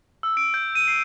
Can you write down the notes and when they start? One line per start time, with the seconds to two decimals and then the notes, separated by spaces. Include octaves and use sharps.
0.23 E6
0.37 D7
0.54 G6
0.75 D#7
0.88 C7